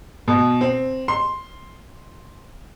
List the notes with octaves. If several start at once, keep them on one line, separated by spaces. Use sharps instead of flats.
B2
C4
C6